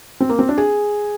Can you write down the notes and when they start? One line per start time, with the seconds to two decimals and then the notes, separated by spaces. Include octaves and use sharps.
0.21 C4
0.29 A#3
0.39 C4
0.49 D4
0.58 G#4